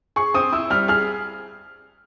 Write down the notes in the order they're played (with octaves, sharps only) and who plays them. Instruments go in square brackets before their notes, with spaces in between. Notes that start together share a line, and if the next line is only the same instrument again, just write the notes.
[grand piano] G#4 [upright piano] C#6
[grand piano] C4 [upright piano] D#6
[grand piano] E4 [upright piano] E6
[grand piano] G3 [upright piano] F6
[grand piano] G#4 [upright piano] F6